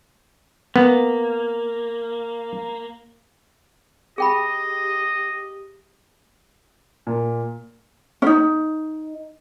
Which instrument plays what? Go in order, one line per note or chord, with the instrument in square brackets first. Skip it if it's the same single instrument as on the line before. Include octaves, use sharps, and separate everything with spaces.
[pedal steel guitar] A#3 [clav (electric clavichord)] B3
[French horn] G4 [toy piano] G#4 G5 B5 [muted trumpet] D#5
[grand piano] A#2
[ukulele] C#4 D#4